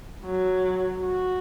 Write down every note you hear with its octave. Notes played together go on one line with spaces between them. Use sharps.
F#3
F#4